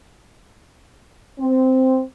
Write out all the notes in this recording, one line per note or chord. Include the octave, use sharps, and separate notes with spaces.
C4